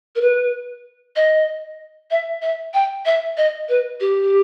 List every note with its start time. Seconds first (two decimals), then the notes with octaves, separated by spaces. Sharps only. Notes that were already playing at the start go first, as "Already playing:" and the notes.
0.16 A#4
0.21 B4
1.16 D#5
2.11 E5
2.42 E5
2.74 G5
3.06 E5
3.37 D#5
3.69 B4
4.01 G4